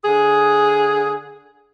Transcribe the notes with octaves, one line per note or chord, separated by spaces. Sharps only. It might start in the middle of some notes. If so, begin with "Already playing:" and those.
D3 G#4